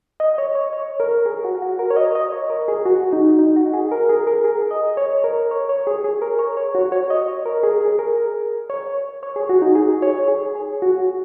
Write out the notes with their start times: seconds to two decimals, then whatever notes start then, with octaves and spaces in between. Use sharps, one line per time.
0.20 D#5
0.38 C#5
0.55 C#5
0.73 C#5
1.00 A#4
1.26 G#4
1.44 F#4
1.62 F#4
1.79 A#4
1.90 C#5
1.96 D#5
2.15 D#5
2.32 C#5
2.50 A#4
2.68 G#4
2.85 F#4
3.13 D#4
3.39 D#4
3.56 F#4
3.74 G#4
3.92 A#4
4.09 G#4
4.27 A#4
4.44 G#4
4.71 D#5
4.97 C#5
5.24 A#4
5.51 C#5
5.69 C#5
5.87 G#4
6.04 G#4
6.22 A#4
6.39 C#5
6.57 C#5
6.75 F#4
6.92 C#5
7.10 D#5
7.28 C#5
7.46 A#4
7.63 G#4
7.81 G#4
7.99 A#4
8.70 C#5
9.23 C#5
9.36 G#4
9.49 F#4
9.62 D#4
9.75 G#4
10.02 C#5
10.28 G#4
10.55 G#4
10.82 F#4